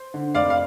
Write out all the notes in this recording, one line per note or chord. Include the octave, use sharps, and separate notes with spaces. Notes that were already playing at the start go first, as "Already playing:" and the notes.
Already playing: C5
D3
F1 D5 F5
F5